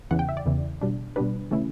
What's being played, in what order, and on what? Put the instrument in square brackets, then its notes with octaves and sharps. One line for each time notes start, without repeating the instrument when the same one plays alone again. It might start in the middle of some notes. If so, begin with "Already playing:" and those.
[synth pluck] E2 C#3 E3 F#5
G5
E5
D5
E2 C#3 E3
B2 G3 D4
B2 G3 D4 B4
C#3 E3 A3 C#4 E4